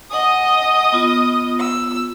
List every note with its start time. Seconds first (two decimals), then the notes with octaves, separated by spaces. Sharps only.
0.11 D#5 F#5 G#5 D#6
0.92 B3 F4
1.60 E6